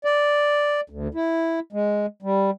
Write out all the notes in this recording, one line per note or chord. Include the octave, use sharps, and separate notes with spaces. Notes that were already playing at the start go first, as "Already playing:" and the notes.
D5
D2
E4
G#3
G3